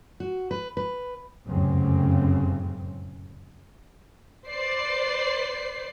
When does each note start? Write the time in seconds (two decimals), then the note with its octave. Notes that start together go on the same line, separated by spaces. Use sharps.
0.20 F#4
0.51 B4
0.77 B4
1.46 F1 C#2 F#2 A2 C#3 C4
4.48 B4 C5 D5 C7